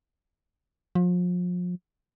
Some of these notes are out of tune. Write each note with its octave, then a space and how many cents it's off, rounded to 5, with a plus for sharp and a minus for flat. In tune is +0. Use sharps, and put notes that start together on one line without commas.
F3 +35